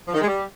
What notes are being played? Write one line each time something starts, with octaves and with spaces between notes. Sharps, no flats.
F3
D#3
G#3
G3